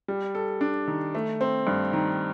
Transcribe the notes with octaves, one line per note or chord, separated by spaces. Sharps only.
G3
A4
D4
D#3
A3
C4
G2
D#3